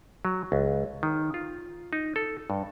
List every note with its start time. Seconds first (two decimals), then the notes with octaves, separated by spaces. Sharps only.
0.25 F#3
0.52 C#2
1.03 D#3
1.34 F4
1.93 D#4
2.16 A4
2.50 G2